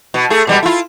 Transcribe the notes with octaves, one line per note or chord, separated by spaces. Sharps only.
B2
A3 G#4
B2 G3 G#3
E4 F4